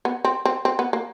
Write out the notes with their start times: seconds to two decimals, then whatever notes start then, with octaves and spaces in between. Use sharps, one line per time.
0.05 B3
0.24 C4
0.45 C4
0.65 C4
0.79 B3
0.93 A#3